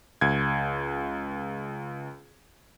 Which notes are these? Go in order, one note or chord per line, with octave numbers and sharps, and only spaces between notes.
C#2 G#6